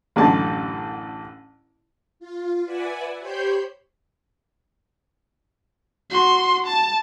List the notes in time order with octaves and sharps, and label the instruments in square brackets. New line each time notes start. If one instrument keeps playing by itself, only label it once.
[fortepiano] A1 F#2 D3 A5
[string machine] F4
B4 D5 E5 F#5 G#5
G4 C5 C#5 B5 C6 G6
[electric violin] F#4 C6
A5